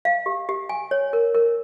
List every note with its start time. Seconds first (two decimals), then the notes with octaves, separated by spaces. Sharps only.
0.05 F5
0.26 G4
0.49 G4
0.69 G#5
0.91 C#5
1.13 A#4
1.35 A#4